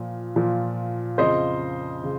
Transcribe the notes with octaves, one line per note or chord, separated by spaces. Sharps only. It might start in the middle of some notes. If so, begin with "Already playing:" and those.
Already playing: A#2 F3
A#2 F3
F2 C#3 F3 C5 D#5
C#3